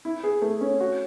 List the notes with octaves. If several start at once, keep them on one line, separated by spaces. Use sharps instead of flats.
E4
G#4
A3
C#4
F#4